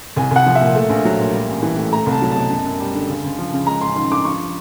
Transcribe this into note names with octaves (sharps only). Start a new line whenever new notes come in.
C2 G#5
C2 F#5
F3
E5
A#2
A3
A#1
F#3
A#2
G3
A1
E3
A2
A3 A#5
C2
A5
F#3
B2 A5
F#2
F#2
G3
D3
C#2
C#2
F3
C#3
G#3 A#5
A1 C6
D#3 C6
G2 D6
F3 C#6